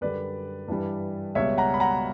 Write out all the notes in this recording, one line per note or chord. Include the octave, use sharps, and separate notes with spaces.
F#2 D3 G3 B4 D5
G2 E3 G3
C#2 B2 G3 C#5 E5
F#5 A#5
B5
F#5 A#5